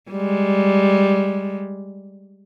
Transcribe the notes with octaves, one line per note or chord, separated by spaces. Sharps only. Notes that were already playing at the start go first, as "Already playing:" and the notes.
G3 G#3